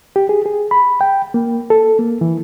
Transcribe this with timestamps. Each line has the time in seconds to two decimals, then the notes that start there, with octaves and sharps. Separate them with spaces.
0.16 G4
0.29 G#4
0.46 G#4
0.71 B5
1.01 G5
1.34 A#3
1.70 A4
1.99 A#3
2.21 E3